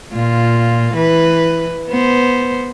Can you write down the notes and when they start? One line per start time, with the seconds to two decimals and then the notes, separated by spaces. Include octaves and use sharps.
0.13 A#2 F4
0.94 E3 B4
1.89 B3 C5